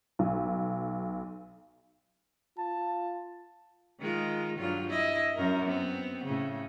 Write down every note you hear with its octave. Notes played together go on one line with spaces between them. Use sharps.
B1
F4 A5
D#3 G#3 F4
G2 F#3 F4
E4 D#5
F#2 A#4
B3 C4
A2 C#3